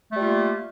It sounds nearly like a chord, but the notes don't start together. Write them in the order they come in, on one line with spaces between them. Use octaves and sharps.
A3 G3 F4 A#3